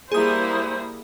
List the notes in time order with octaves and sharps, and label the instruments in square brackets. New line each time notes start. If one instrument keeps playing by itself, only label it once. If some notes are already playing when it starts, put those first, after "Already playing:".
[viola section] G3 A#3 E4 [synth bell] G#4 D#6 [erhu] C5